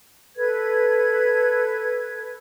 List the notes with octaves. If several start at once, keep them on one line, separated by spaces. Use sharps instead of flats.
A4 B4 G#6